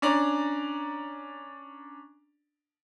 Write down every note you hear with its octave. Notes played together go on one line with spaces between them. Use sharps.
C#4 D4 D5 A#5